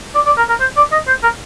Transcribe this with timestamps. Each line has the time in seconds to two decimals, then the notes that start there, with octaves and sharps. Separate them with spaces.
0.15 D5
0.26 D5
0.38 A#4
0.49 A#4
0.61 C5
0.77 D5
0.92 D#5
1.07 C5
1.23 A#4